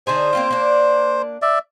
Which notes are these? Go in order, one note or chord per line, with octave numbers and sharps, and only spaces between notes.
D3 D#4 G#4 C5
A#3 C4 F4
A#3 D4
D5 E5